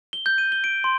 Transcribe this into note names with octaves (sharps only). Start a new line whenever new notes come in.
G7
G6
D#7
G7
D7
C6